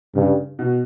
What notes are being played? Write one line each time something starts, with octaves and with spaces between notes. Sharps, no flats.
G2 C#3
B2